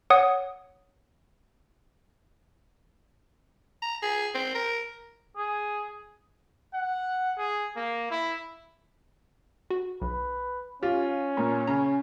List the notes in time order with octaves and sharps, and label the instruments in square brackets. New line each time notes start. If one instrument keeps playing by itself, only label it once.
[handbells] C#5 F#5 D#6 C#7
[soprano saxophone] A#5
G#4
C4
A#4
[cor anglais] G#4
[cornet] F#5
G#4
A#3
E4
[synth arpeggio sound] F#4
[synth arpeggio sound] B1 [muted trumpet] B4
[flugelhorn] C#4 [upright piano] F4 [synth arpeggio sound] G4 [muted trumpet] F5
[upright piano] A#2 [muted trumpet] A#4
[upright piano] C#3 [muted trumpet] G#5 [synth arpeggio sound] A#5